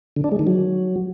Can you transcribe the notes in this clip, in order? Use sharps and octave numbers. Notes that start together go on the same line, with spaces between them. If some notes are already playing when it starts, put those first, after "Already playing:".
D3
D4
G#3
D#3
F#3